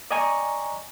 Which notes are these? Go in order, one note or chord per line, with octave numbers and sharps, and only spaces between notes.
D5 D#5 G5 G#5 A#5 C#6